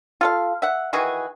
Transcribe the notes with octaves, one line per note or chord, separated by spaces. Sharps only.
F4 A4 F5
E5 F#5
D#3 E3 F#4 G#4